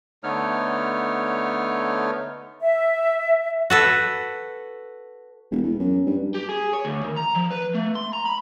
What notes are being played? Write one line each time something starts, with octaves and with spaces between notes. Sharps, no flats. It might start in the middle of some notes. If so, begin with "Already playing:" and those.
D3 A3 B3 D#4 C#5 F6
E5
F#4 A4 B4
E1
E2
F#2
G2
G4
G#4
C#5
D2
D#3
A#5
F3
B4
A3
C6
A#5
B5